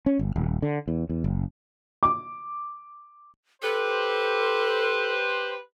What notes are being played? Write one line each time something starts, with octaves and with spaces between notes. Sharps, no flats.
C#4
G1
D#1
D3
E2
E2
F#1
D6
G4 A4 B4 C5